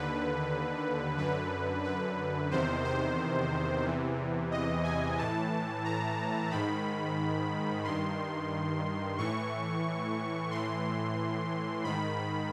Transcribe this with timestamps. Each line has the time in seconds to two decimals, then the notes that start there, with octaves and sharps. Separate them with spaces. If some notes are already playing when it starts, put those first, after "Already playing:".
Already playing: D#2 D3 B4
1.18 F#2 D3 B4
1.84 B4
2.51 E2 C3 D#3 C5
2.84 C5
3.85 E2 C3 E3
4.51 D#5
4.84 G#5
5.18 A2 E3 A5
5.85 A#5
6.51 G#2 D#3 B5
7.84 G2 D#3 C6
9.18 A2 E3 C#6
10.51 A2 E3 C6
11.84 G#2 D#3 B5